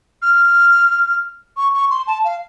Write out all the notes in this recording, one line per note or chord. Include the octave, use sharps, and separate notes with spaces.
F6
C#6
C#6
C6
A5
F5